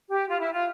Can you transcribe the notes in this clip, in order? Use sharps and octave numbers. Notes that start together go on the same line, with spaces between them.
G4
F4
E4
F4